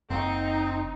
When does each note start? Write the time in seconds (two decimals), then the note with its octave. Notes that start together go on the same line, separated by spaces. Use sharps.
0.10 F#1 C4 D#4